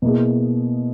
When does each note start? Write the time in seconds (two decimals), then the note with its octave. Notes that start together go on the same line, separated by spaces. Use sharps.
0.02 B2 A#3 E4 G#4